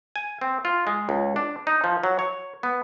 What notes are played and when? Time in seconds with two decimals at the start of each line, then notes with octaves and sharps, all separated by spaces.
0.16 G#5
0.41 C4
0.65 F4
0.87 G#3
1.09 C#2
1.36 D4
1.67 D#4
1.84 F3
2.04 F#3
2.19 C#5
2.63 B3